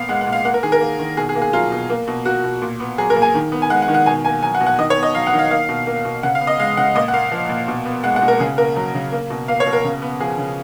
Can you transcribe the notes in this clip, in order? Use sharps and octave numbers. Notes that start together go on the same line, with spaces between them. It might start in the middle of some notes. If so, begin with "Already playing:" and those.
Already playing: A#2 B3 F5
G#3 F#5
F#5
A#2
F5
A#3 F#5
A#4
D#3 G#4
A#4
A#3
D#3
B2 G#4
G#4
A#3
G#4
F#3 F4
B2
A#3
B2
A#3 F#4
B2
A#2
B3
F#3 G#4
A#4
A#2
G#5
D#3
B3
G#5
G#3 F#5
F#5
D#3
F#5
B2 G#5
A#3 G#5
F#3 G#5
F#5
B2
F#5
D#3 D#5
C#5
B3
D#5
F#3 F5
F#5
D#3
F5
A#3 F5
B2
A#3
B2
C#3 F#5
F5
B3
D#5
G#3 F5
C#3 F#5
A#2 D#5
F#5
A#3 F5
F3
A#2
B2
B3
G#3 F#5
F#5
B2
A#4
C#3 G#4
A#3 A#4
F#3
C#3
A#3
B2
A#3 F5
C#5
B2
A#4
C#3
B3
F3 G#4
C#3